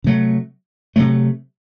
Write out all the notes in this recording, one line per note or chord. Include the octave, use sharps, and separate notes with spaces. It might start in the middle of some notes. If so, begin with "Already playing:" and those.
C3 F#3 A3
C3 F#3 A3